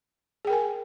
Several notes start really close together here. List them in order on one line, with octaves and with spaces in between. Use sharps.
G#4 G5 A#4 G#5